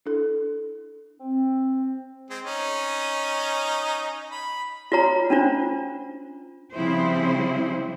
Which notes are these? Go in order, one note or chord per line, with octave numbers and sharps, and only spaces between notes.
D4 E4 A4
C4
G#3 C4
C#4 D#4
B5
F4 F#4 C#5 A#5
C#4 D4 F4 C5
C#3 F3 G3 C4 E4 C5